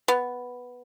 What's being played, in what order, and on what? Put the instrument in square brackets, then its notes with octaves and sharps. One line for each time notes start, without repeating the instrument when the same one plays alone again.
[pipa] B3